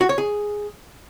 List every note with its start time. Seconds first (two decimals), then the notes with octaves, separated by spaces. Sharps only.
0.01 F#4
0.09 C#5
0.18 G#4